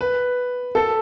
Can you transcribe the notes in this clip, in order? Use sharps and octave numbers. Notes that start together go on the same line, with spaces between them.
B4
A4